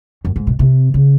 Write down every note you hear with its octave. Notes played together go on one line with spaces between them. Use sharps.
F#2
G#2
B2
C3
C#3